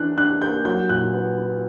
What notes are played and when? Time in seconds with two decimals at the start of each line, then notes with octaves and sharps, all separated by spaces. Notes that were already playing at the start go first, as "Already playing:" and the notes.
Already playing: E3 D4 F#6
0.17 D4 F#6
0.42 A#3 G6
0.65 F#3 G6
0.89 A#2 F#6
1.13 B3
1.38 B3